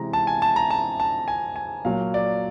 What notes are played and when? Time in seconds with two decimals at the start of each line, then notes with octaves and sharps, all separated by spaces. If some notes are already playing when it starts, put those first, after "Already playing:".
Already playing: C3 E3 G#3 A#5
0.13 A5
0.27 G#5
0.42 A5
0.56 A#5
0.70 A5
1.00 A5
1.28 G#5
1.56 G#5
1.85 A#2 F#3 A#3 F5
2.14 D5